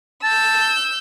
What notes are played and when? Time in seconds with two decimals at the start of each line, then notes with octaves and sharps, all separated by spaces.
0.23 A5 E6 G6